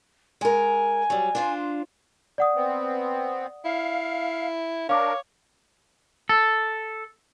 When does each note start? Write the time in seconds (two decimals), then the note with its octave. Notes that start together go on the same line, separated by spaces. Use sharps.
0.41 G#3 A#4 G#5
1.10 F#3 G3
1.35 D4 F4 C5
2.38 D5 F#5 D#6
2.56 B3 C4
3.65 E4 F5
4.89 D4 A#4 C#5 F5 D6
6.29 A4